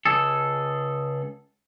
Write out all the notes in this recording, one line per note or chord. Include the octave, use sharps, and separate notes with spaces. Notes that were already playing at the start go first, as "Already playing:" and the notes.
C#2 G#4 A4